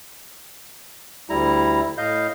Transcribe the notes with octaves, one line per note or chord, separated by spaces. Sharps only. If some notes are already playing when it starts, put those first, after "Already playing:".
D2 G3 E4 A#5
A2 D#5 F5 G6